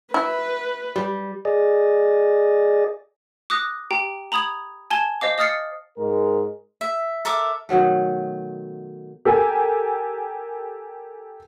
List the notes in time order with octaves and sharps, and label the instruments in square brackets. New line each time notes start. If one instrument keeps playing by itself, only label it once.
[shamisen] E4 [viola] B4
[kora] G3
[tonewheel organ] G#4 D5 D#5
[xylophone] D6 D#6 F#6 A#6
G4 G5 A#5
A#5 B5 D#6 G#6 F7
G#5 A5 G#6 G7
C5 D#5 F5 D6
D#5 D#6 F6 A6 C7 C#7
[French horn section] G#2 G#3 A#4
[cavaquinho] E5
A4 A#4 E5 D6
[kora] B2 D#3 F#3 A3
[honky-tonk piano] G4 A4 A#4 G#5